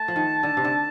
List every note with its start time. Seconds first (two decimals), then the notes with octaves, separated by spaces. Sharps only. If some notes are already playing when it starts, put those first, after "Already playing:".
Already playing: A3 A5
0.08 F3
0.16 D#3
0.43 D3
0.57 C3
0.64 D3